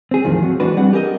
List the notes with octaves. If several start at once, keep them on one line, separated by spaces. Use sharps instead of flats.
C4 G#4
E2 A2 D#3 F3
F#3 C4
E3 G#3 D4 F#4 B4
G3 C4 D4 F#5
G4 G#4 A#4 D#5